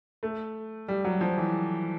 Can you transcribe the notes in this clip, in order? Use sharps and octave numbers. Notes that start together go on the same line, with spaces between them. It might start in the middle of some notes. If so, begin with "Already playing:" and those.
A3
G3
F#3
F3
E3